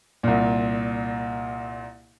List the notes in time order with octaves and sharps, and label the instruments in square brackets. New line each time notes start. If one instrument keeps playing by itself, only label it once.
[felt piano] C2 A#2